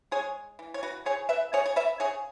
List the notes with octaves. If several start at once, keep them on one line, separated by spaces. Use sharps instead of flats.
G#3 G#4 C#5
E3
C#5
F#4 B4
C#3 G#4 C#5
B4 E5
C#3 G#4 C#5
C#5
B4 E5
C#3 G#4 C#5